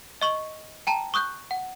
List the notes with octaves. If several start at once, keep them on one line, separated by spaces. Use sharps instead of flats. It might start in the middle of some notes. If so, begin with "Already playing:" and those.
D#5 C#6 F#7
G5 A5 A#5
C#6 D#6 F#6 G6
F#5